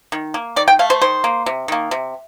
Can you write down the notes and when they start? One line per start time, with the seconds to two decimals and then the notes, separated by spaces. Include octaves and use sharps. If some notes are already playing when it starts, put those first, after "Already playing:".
0.12 D#3
0.34 A#3
0.56 D#3 D5
0.68 G5
0.79 A3 F5
0.90 C5
1.02 D#3 C5
1.24 A#3
1.46 C3
1.68 D#3 A#3
1.91 C3